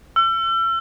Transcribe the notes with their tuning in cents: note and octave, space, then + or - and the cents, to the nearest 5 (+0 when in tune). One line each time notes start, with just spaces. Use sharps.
E6 +40